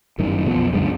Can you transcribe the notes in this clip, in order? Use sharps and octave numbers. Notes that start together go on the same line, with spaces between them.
G1 F#2 A2 D#3
F1 B1 F3 B3
C#2 F#2 D3 G#3